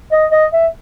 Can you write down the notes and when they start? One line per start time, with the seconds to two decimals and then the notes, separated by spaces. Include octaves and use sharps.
0.12 D#5
0.32 D#5
0.53 E5